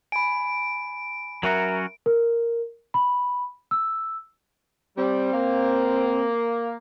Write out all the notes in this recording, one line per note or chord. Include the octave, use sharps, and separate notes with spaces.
G#5 B5 D7
F#3 C#4 F#4 A#4 E5 A#5
A#4
B5
E6
G3 C4
A#3